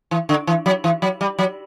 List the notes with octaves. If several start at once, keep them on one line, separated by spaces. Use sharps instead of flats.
E3
D3
E3
F#3
E3
F#3
G3
F#3